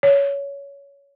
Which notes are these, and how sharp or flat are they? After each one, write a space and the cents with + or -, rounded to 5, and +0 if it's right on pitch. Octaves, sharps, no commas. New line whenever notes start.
C#5 +20